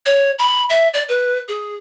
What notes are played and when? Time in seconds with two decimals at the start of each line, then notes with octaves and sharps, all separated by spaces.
0.06 C#5
0.39 B5
0.70 E5
0.94 D5
1.09 B4
1.48 G#4